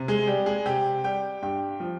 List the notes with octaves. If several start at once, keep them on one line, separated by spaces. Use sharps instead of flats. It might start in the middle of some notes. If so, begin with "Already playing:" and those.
Already playing: C3
G#3 G#4
G3 G4
G#3 G#4
C3 G4 G5
G3 G4 G5
G2 G4 G5
F3